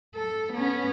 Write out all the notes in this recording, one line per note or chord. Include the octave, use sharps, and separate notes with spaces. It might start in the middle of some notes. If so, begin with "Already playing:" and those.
A4
B3 C#4